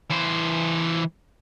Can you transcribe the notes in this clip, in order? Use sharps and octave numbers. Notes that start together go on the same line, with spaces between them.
E3 C5